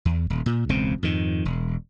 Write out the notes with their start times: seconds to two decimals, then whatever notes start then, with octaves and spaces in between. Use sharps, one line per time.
0.05 E2
0.30 D#1
0.46 A#2
0.69 E1 C#2 C#3 C4
1.03 F2 G#2 D#3
1.45 E1